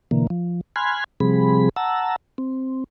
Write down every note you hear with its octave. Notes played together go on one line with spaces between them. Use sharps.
B2 D3 E3 A#3
F3
G#5 B5 C6 F6 F#6 G#6
C3 F3 G3 C4 G#4 B5
F#5 A5 A#5 E6
C4